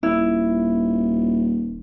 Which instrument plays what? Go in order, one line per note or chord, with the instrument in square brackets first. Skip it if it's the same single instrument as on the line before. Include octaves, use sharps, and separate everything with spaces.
[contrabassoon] D#1 [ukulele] E4